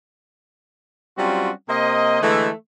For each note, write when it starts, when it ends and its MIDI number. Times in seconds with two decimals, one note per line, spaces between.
1.18 1.51 54
1.18 1.51 55
1.18 1.51 60
1.18 1.51 61
1.18 1.51 65
1.18 1.51 66
1.68 2.20 48
1.68 2.20 58
1.68 2.20 72
1.68 2.20 75
2.22 2.49 50
2.22 2.49 52
2.22 2.49 56
2.22 2.49 57